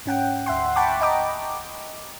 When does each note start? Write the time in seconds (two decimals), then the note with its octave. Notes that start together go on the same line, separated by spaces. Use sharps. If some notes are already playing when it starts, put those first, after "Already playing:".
0.06 G#2 C#4 F#5 G5
0.46 D2 E5 F#5 C6
0.76 F#5 G5 A5 B5 C#6 D6
1.01 D#5 G5 A#5 D6